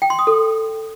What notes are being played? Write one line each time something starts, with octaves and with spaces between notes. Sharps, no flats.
G5
C6
D#6
A4